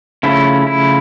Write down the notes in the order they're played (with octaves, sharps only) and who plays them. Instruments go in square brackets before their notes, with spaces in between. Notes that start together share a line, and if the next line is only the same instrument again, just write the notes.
[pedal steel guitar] C#3 F3 A3 C#4 E4
E4